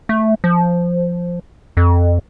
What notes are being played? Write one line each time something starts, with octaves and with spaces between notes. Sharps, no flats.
A3
F3
F2